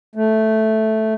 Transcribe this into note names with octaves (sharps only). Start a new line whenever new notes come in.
A3